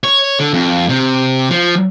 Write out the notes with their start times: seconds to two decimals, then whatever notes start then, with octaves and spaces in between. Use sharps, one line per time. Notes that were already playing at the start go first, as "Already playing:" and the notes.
0.04 C#5
0.40 D3
0.53 F2
0.89 C3
1.50 F3